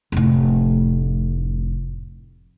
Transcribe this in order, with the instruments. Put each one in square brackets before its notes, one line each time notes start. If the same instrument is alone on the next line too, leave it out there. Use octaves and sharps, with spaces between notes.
[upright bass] F1 A2